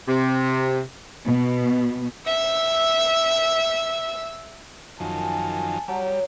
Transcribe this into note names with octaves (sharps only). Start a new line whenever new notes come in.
C3
B2
E5 E6
F#2 D#3 F3 G#5 A5
F#3 G3